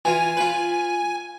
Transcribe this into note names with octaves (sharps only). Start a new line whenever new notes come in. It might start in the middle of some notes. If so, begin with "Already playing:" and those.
E3 F4 G#5
F4 B4